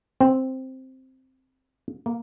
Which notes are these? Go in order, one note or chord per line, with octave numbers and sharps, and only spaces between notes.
C4
A#3